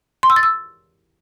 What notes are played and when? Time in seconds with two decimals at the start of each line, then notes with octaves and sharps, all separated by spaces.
0.23 C6
0.30 E6
0.36 A6
0.43 E6